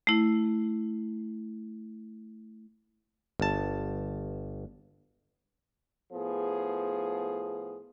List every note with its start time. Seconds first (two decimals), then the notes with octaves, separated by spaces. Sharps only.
0.07 A3 E4
3.40 G1 A5
6.11 A2 F3 B3 G#4